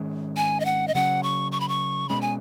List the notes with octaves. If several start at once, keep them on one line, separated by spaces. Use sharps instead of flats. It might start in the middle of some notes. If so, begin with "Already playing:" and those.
Already playing: G#2 D#3 G#3 C#4
G#5
D#5
F#5
D#5
C#3 F#3 C#4 F#5
C#6
C#6
B5
C#6
B2 G#3 C#4 B5
G#5